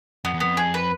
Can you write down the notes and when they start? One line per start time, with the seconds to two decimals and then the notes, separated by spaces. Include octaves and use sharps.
0.25 F2 B3
0.34 E2
0.40 F2 B3
0.57 G#4
0.74 B4